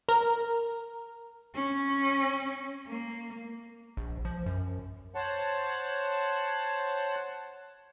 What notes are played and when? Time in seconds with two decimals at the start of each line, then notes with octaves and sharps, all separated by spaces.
0.09 A#4
1.55 C#4
2.87 A#3
3.97 A#1
4.25 F3
4.46 F#2
5.15 C5 C#5 F#5 A5